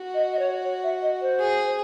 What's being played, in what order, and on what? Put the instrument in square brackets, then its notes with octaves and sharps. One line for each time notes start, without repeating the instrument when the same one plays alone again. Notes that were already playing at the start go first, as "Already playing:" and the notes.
Already playing: [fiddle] F#4
[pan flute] D#5
D#5
C#5
C#5
E5
D#5
C5
[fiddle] G#4